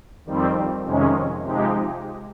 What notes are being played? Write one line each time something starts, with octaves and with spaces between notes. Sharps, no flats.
F2 D#3 G3 C4
F2 C3 D#3 G#3 C#4
C3 F3 G#3 D#4 G4